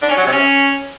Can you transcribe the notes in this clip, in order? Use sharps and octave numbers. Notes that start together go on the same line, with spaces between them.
D4
C#4
F#3
C3
C#4